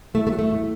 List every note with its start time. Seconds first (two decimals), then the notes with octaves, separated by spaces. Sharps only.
0.14 A2 A3
0.27 A3
0.32 F#3
0.39 A3
0.51 A2